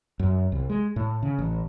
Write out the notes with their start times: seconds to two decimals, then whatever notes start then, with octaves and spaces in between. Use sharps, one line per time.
0.19 F#2
0.52 C2
0.70 G#3
0.96 A2
1.23 C#3
1.39 A1